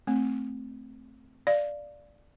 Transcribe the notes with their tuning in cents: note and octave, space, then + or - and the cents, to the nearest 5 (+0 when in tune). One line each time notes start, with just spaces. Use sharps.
A3 +0 C4 +0
D5 +0 F5 +0